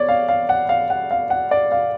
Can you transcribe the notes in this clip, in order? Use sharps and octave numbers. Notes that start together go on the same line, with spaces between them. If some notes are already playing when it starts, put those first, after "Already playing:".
Already playing: B3 C#5 D5
F5
F5
F#5
F5
F#5
F5
F#5
D5
F5